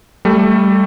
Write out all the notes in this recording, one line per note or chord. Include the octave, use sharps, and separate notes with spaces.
G3 A3